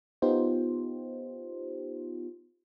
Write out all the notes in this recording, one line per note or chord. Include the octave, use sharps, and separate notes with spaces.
B3 D#4 F4 G4 C5